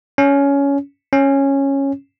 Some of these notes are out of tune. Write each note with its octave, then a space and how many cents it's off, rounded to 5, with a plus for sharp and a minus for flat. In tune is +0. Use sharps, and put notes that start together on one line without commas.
C#4 +15
C#4 -10